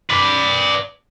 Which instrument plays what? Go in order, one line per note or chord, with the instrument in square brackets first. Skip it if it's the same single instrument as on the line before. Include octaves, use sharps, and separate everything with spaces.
[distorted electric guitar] B4 D5